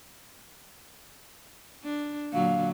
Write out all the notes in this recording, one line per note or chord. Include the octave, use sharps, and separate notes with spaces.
D4
A#2 D3 F#3 F5